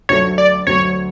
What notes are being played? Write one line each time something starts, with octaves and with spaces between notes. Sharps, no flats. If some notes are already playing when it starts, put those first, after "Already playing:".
D2 D3 F#3 A3 C#5
D5
D2 D3 F#3 A3 C#5